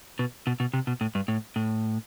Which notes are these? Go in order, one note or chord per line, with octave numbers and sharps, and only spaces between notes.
B2
B2
B2
C3
B2
A2
G2
A2
A2